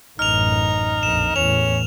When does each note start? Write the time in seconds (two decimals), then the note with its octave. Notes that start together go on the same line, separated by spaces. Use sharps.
0.19 A1 F#2 D#4 F6 F7
1.03 A#1 F2 E7
1.36 E2 A2 C#4 F7